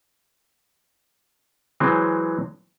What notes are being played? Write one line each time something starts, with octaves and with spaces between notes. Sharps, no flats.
E3 F#3 G#3 C4